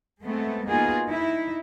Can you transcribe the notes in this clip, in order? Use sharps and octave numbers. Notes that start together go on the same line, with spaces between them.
G#3 A3 B3 C4 A4
A#3 B3 D#4 F4 F#4 G#4
D#4 E4